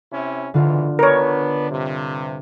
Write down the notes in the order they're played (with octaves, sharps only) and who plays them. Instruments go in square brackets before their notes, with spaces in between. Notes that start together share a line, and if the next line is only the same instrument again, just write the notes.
[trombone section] C3 C#4 E4
[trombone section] B1 G#2 E3 [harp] D3 F4
[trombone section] B3 D4 B4 [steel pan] A#4 C#5
[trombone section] G2 C3